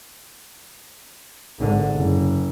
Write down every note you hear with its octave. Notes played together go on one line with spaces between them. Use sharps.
G#1 D3
F#1